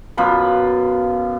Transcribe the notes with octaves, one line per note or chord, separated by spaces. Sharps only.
F#2 B2 F4 B5